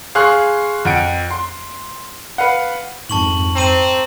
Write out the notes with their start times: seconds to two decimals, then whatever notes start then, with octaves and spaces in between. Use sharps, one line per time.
0.15 G#4 F5 C6 C#6 F#6
0.85 F2 F#5 D7
1.31 C6
2.38 B4 F5 F#5
3.10 F2 G#2 A5 C#6 F#7
3.56 C4 A#5 D#7 F#7